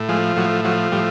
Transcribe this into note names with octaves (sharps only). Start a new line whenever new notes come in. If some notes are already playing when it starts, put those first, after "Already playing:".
Already playing: A2
F3 G#3
A2 F#3
F3 F#3
A2 G3